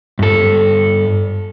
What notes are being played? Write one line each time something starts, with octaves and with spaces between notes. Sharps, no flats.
G2 A4